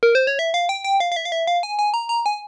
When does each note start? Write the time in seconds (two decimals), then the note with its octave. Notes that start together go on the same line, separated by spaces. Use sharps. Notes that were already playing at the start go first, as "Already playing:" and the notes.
0.03 A#4
0.15 C5
0.27 C#5
0.39 E5
0.54 F5
0.69 G5
0.84 G5
1.00 F5
1.12 F5
1.16 E5
1.25 F5
1.32 E5
1.47 F5
1.63 G#5
1.79 G#5
1.94 A#5
2.09 A#5
2.26 G#5